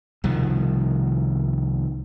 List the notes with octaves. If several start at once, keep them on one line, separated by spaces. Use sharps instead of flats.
C2 B2 D#3 F3